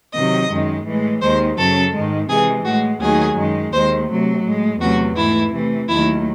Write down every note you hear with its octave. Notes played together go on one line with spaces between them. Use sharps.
C3 D#3 F#3 D#5
F#2 D#3 G#3
A2 E3 G#3
D#2 D#3 G#3 C5
F#2 C#3 F#3 A4
G#2 D#3 G#3
C3 E3 G#3 G#4
A2 G#3 F#4
D#2 D#3 F#3 A3 G#4
F#2 D#3 G#3
D#2 D#3 G#3 C5
C3 F#3 A3
A2 G#3
E2 C3 F#3 A3 F#4
G#2 E3 A3 E4
C3 E3 A3
D#2 D#3 F#3 A3 E4